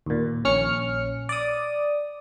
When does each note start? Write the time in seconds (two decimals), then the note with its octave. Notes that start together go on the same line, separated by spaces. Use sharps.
0.06 D#2 A#2
0.45 A#1 C#4 F6 C#7
1.29 D5 D#6